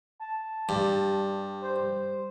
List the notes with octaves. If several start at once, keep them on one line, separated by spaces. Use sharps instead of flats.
A5
G2 G3
C5